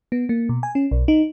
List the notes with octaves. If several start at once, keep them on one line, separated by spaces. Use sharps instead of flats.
B3
A#3
B2
G#5
C#4
B1
D#4